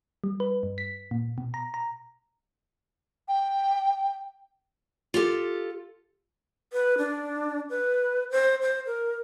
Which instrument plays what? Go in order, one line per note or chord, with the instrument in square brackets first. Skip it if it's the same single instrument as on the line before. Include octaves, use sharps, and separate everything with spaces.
[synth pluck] G3
B4
G2
B6
A#2
B2
A#5
A#5
[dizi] G5
[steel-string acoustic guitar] F4 G4 A4
[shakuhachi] B4
D4
B4
C5
C5
A#4